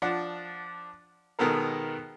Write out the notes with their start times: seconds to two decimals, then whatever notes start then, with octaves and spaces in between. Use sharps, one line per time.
0.02 F3 D4 F#5
1.39 B2 D#3 G#3 B3 A4 A#4